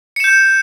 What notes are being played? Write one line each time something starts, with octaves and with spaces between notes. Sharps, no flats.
G6 C#7 E7